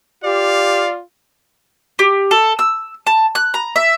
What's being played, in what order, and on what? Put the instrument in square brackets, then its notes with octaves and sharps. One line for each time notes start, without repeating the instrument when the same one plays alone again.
[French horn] F4 [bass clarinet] G4 [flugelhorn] D5 [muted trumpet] F5
[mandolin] G4
A4
E6
A5
F#6
A#5
E5